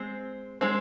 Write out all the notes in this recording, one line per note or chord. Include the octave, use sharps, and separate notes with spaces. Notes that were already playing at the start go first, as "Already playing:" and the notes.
Already playing: G#3 C4
G#3 C4